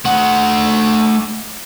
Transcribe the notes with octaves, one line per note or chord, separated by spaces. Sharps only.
A3 F#5